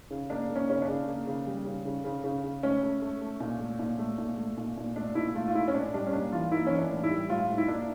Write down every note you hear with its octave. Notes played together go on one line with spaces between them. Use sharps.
C#3
A#3 D4
A#3
C#4
C#3 C#4
D4
C#3
A#3
C#3
G3
C#3
C#3
C#3
C#3
C#3
A3 C#4
A3
A3
A3
A#2
A3
A#2
A3
A#2
A3
A#2
A#2
A3 D4
A#2 E4
A3 F4
F4
A3 E4
C#4
A2 D4
G3 D4
C#4
A#3 D4
E3 F4
A#3 E4
E3 C#4
D4
A2
E4
G3
A2 F4
A2
E4
A#3 D4